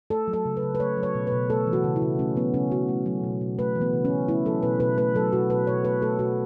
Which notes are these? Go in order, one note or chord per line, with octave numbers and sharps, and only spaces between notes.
A3 A4
F#3
A4
C#3
B4
C#3
B4
A3 C#5
F#3
C#5
B2
B2 B4
A3 A4
E3
F#4
C#3
E4
C#3
A3 C#4
F#3 B3
C#3 C#4
C#3 F#4
A3
F#3
B2
B2
A3 B4
E3
B3
C#3
C#4
C#3
A3 E4
F#3 A4
B2 B4
B2 B4
A3 B4
F#3 A4
B2 F#4
B2 B4
B2 C#5
A3 B4
A3 A4
B2 F#4